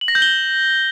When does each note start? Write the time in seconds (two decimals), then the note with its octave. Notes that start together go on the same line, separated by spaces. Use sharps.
0.01 F#7
0.08 A#6
0.15 G6
0.22 G7